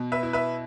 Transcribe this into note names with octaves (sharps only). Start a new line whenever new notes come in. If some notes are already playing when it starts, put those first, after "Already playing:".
Already playing: B2
B4 E5
E4
B4 E5